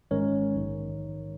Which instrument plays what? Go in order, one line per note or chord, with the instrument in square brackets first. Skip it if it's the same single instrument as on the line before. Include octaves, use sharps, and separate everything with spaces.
[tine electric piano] G#1 G#2 D#3 G#3 C#4 A#4 C#5
A#1 G#2 D#3